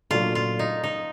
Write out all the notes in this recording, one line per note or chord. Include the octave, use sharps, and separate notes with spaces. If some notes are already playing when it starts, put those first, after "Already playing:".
A#2 F#3 A3 D4 F4
F4
D#4
D#4